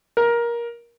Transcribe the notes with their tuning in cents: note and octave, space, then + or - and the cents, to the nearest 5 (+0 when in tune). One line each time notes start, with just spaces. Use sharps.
A#4 +15